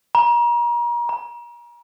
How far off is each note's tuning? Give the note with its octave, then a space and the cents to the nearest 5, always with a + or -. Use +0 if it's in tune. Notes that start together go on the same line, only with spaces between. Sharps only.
A#5 +35
A#5 +35